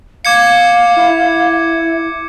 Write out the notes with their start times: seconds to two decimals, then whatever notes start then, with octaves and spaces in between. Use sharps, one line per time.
0.25 F5 D6 G#6 C#7
0.96 E4